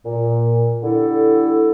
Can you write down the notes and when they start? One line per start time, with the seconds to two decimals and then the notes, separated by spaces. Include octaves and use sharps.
0.05 A#2
0.83 D3 G3 E4 A4